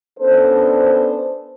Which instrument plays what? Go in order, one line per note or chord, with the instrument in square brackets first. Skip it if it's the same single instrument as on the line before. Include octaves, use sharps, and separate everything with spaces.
[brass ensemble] B3 C#4 D4 A4 C5